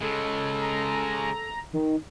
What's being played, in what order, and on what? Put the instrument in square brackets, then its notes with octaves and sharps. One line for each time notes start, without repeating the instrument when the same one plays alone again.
[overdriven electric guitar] C#3 G#3 [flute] A4
[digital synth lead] A#5
D#3